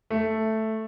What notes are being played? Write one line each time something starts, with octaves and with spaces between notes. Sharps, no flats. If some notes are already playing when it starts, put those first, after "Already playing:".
A3